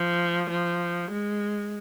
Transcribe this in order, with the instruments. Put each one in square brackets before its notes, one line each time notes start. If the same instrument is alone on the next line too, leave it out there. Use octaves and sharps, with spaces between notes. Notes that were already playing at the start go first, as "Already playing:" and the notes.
Already playing: [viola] F3
F3
G#3